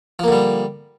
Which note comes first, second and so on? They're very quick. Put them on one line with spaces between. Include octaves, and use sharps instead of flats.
F3 A#3 D3 G3